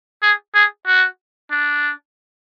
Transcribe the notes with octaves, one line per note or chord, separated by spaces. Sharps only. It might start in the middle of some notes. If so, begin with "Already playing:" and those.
G#4
G#4
F#4
D4